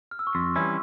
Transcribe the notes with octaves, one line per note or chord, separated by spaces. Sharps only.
F6
E6
C#6
F2 C6
E3 G3 C#4 E4